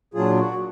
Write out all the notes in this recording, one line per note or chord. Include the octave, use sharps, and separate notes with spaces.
A#2 F#3 D4 F4 G#4
F#4